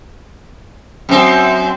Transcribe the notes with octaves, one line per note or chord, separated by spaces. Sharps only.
F#2 C4